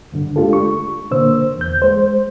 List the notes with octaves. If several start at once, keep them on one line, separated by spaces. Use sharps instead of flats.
D2 G2 D3
G#3 A3 D4 F4 G4 A4
C#6
A#2 D3 A#3 C5 E6
E2 G6
G#3 C5